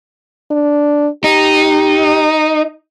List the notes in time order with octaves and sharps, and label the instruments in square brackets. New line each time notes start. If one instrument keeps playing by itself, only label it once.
[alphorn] D4
[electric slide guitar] D#4 [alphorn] G4